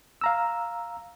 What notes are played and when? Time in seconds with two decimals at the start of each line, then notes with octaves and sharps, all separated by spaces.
0.21 F5 A#5 E6